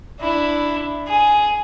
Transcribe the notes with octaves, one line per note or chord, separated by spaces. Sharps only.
D4 E4
G#4